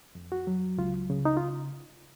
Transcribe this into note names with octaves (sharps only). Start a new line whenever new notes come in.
F2
F#4
F#3
C#2 F4
C#3
D#4
F4